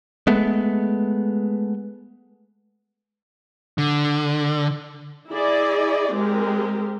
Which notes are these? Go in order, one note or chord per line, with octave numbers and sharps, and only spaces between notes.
G#3 A3 B3
D3
E4 G#4 D5 D#5
G#3 C4 G4 A#4